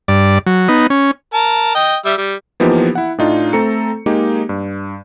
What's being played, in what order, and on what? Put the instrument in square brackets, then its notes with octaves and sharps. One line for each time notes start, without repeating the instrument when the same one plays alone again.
[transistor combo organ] G2 D5
F#3
B3 D#4
C#4
[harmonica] A#4 A5
D#5 G5
G3 E5
G3
[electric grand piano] E3 F3 A#3 B3 D#4 G4
E4 F#5
A2 D4 D#4 F4
A3 C4 A4 A#5 C#7
G#3 A#3 D#4 G4 G#4
G2